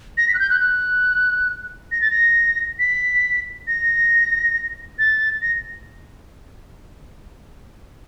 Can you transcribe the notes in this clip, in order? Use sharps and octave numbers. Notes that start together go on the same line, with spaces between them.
A#6
B6
F#6
G6
F#6
F#6
A#6
A6
A#6
B6
A#6
A6
A#6